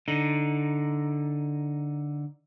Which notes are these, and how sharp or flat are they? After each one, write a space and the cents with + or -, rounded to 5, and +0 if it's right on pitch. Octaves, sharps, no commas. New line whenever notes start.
D3 +0 D#4 +0